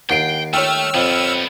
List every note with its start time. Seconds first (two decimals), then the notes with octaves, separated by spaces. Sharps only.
0.10 D#2 F#5 G5 C7 D7
0.53 A3 C#5 G5 E6 F6
0.94 F2 G3 B3